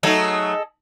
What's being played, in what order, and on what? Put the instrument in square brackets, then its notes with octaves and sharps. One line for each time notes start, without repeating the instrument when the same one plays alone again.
[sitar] F#3 A3 D#4 [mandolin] G#4 A4 D#5